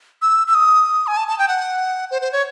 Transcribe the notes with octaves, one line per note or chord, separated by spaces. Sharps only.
E6
E6
D#6
G#5
A5
A5
G5
F#5
C5
C5
C#5